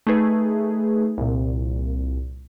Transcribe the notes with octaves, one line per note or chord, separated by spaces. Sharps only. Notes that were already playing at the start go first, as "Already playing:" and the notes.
A3 D#4 G#4 B4
C2 A#2